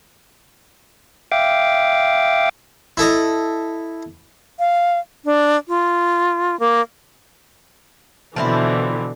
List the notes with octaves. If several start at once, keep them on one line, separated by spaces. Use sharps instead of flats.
E5 F5 G5 D6
E4 A4 D#5
F5
D4
F4
A#3
B2 D3 E3 F3 C4 E4